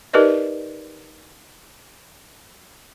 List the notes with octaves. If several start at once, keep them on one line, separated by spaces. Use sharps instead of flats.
D#4 G4 A#4 B4 D5 D#5